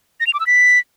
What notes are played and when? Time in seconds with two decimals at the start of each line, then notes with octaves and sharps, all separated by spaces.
0.20 A#6
0.27 F7
0.33 D6
0.40 E6
0.47 B6